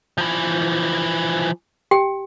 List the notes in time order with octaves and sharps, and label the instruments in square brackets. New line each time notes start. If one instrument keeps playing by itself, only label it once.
[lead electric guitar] E3 F3
[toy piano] G4 G5